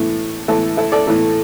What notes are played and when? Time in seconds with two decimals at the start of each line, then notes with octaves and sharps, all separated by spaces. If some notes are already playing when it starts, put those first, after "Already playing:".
Already playing: A2 E3 A3
0.48 A2 E3 A3 E4 A4
0.77 E4 A4
0.92 A4 D5
1.07 A2 E3 A3